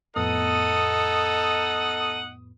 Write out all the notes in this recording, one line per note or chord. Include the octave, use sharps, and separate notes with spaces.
F2 A2 B3 D#4 A4 D#5 F#5 D#6